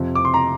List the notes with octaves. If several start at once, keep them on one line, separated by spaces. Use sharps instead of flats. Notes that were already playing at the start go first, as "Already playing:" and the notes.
Already playing: F2 C3 F3
D6
C6
A#5